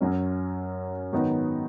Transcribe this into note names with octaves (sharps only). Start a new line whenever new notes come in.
F#2 F#3 C#4
G#2 D#3 F#3 B3 D#4